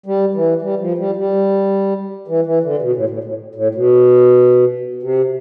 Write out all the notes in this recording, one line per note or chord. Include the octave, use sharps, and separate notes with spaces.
G3
E3
G3
F3
G3
G3
E3
E3
D3
C3
B2
A2
A2
A2
A2
B2
C3